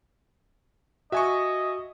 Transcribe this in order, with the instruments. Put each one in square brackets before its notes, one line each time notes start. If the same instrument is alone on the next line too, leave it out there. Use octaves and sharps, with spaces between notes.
[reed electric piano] F#4 [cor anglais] D#5 [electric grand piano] E5 G#5 C#6